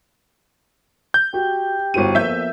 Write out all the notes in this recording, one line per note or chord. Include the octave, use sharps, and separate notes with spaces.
G6
F#4 G4
G1 E4 F#4 C5 D#7
F2 F3 A#3 B3 E5 G6